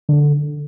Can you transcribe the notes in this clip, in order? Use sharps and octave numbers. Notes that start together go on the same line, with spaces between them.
D3